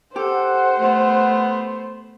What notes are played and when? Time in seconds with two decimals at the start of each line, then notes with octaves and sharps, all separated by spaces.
0.16 G4 A4 C5 F#5
0.78 A3 B3